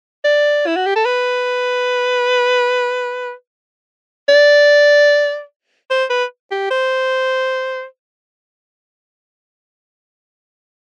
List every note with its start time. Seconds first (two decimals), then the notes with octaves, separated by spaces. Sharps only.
0.24 D5
0.67 E4
0.76 F#4
0.86 G4
0.96 A4
1.05 B4
4.29 D5
5.90 C5
6.10 B4
6.51 G4
6.71 C5